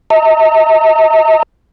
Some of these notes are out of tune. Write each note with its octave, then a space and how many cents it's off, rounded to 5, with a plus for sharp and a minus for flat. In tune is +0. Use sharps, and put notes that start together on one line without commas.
D#5 +45 A#5 -45